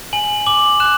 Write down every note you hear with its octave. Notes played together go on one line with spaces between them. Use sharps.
G#5 F#7
D6 F#7
F#6 E7